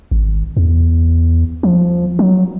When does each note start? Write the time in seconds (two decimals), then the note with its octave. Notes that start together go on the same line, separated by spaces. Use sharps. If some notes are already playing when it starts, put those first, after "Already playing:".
0.11 G#1
0.57 E2
1.63 F3
2.19 F#3